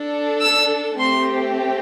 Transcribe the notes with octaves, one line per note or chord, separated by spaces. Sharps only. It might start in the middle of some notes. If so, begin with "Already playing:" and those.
Already playing: D4 A4
E6
A3 C4 G4 C6